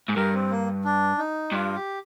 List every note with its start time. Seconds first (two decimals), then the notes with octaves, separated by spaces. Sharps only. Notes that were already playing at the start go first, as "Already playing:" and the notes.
0.08 G#2
0.16 G2 A#4
0.34 C4
0.51 A#3
0.84 D4
1.18 D#4
1.52 G2 F4
1.75 G4